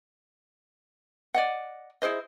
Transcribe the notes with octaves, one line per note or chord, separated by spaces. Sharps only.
D5 D#5 F#5
E4 G#4 C5 D#5